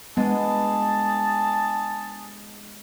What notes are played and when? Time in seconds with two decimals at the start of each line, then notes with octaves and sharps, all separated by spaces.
0.17 G#3 B3 D4 G#4 A5